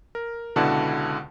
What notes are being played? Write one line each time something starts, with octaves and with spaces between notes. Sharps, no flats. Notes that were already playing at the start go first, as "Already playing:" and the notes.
A#4
C#2 B2 D3 E4 F#5 A5